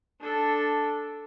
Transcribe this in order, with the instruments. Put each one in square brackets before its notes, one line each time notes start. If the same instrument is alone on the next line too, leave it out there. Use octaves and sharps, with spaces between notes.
[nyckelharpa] D4 A4